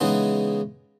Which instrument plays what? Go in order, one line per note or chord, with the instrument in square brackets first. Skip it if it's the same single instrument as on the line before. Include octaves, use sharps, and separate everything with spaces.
[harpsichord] C#3 E3 G#3 B3 D#4